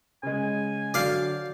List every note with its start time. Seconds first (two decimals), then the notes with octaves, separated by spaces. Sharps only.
0.23 C#3 G#3 G#5
0.94 D3 F#3 D5 F5 G6